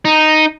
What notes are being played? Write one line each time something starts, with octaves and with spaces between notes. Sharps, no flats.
D#4